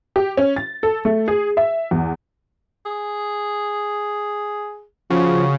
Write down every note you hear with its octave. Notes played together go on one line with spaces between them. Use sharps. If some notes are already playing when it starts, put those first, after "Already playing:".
G4
C#4
A6
A4
A3
G#4
E5
E2
G#4
C#3 F3 F#4